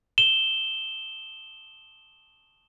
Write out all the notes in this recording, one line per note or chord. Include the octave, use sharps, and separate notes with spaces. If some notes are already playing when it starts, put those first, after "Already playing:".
E7 G7